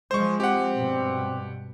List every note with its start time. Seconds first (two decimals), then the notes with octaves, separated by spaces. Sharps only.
0.11 F3 G#3 C5 C#6
0.40 C4 G4 F#5
0.75 G2 B2